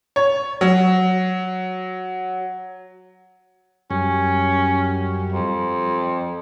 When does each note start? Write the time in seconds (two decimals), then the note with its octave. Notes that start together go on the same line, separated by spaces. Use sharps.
0.16 C#5
0.61 F#3
3.91 F#2 G3 C#4
5.32 F2